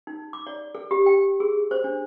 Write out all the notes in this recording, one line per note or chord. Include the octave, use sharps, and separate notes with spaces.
D#4
D6
D5
A4
G4
G5
G#4
C5
D4